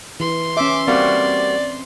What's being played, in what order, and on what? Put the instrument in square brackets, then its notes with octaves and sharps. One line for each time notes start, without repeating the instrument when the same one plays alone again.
[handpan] E3 [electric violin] C6
[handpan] C#4 E5 [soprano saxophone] D6
[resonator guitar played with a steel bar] G3 A#3 F#4 [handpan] C4 [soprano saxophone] D5